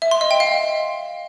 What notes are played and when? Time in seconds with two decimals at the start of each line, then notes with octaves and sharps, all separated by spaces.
0.02 E5
0.11 C6
0.21 D#5
0.31 G5
0.40 F5